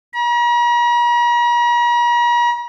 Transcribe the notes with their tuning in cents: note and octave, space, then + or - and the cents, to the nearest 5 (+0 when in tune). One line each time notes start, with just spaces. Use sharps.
A#5 +45